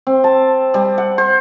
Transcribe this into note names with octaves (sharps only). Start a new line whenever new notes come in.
C4
A5
G3
F#5
C5